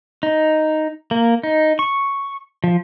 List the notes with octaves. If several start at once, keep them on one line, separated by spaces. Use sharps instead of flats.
D#4
A#3
D#4
C#6
F3